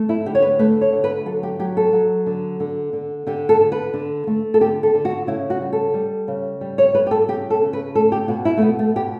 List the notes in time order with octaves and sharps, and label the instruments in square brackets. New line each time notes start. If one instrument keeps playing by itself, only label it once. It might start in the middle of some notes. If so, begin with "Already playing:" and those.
Already playing: [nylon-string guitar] A3
E4
D3 G4
C#5
B4
A3 B4
C#5
D3
B4
F#3 A4
G4
F#3 G4
A4
F#3
D3
D3
D3
D3 G4
A4
D3
B4
D3
A3
A4
D3 G4
A4
D3
F#4
C#3 E4
F#4
G3
A4
G3
C#3
G3
C#5
G3 B4
G4
A4
C#3 G4
A4
C#3
B4
A3 A4
G4
B2 F#4
E4
A3
B2 B3
A3
B2 G4